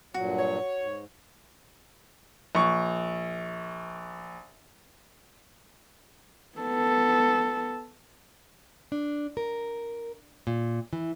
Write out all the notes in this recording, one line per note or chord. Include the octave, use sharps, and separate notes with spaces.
G2 A#2 F#3 F#4
C#5
G#2
A#1 C#6
B3 A4
D4
A#4
A#2
E3